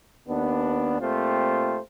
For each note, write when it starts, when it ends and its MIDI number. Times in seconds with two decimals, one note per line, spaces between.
0.28 0.98 39
0.28 0.98 59
0.28 0.98 62
1.00 1.79 46
1.00 1.79 57
1.00 1.79 60
1.00 1.79 65
1.00 1.79 67
1.00 1.79 72